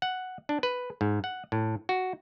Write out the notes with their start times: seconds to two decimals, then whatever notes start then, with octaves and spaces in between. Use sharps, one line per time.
0.02 F#5
0.49 D4
0.63 B4
1.01 G#2
1.24 F#5
1.52 A2
1.89 F#4